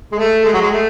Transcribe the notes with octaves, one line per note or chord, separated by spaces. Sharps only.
G#3
A3
G#3
F#3
G#3
A3